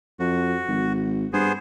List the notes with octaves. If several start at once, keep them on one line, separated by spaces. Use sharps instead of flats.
F2 F#4
G#1
G2 B3 G#4 C5